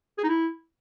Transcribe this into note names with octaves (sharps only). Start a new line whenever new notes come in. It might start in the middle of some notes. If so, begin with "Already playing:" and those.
G#4
D#4
E4